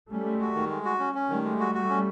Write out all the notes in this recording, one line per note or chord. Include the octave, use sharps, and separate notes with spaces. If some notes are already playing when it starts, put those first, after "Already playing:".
G3 A3 C#4
G#3
F#4
D#3
G#3
F#4
C#4
C#4
D#3 G3 A3
G#3
F#4
F#4
C#4